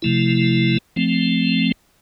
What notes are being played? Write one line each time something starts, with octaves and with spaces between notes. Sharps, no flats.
C3 F3 A3 E4
F3 A3 C4